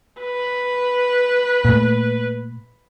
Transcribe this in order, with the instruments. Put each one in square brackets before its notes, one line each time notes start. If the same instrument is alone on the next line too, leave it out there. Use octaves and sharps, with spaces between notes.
[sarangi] B4
[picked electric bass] A#2 A3